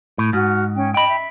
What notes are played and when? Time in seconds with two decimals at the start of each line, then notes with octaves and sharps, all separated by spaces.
0.18 A2
0.33 G#2 F#4 F6
0.76 C#4 G5
0.94 D#5 G5 B5
1.08 E5